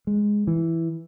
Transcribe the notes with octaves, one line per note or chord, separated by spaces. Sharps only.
G#3
E3